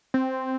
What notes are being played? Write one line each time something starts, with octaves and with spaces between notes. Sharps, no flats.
C4